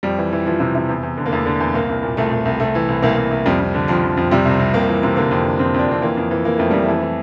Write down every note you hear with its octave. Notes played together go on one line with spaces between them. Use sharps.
F2 G3
E3
E3
E3 F3
C3
C3
E2
E2
D3
A#3
E2 A3
D3
E2
C2 A#3
C2
A#2
C2 A3
C2
C2
C2 A3
E3
C2
C2 A#3
C2
C2
F2 G3
F2
D3
F2 F3
F2
F2
C3 G3
C2
C2
C2 A#3
E3
C3
D3 A#3
F2
D3
F2 C4
F2
D4
F2 C4
E3 A#3
F2
E3
E3 A#3
F2 A3
F2 G3
A3
E3
E3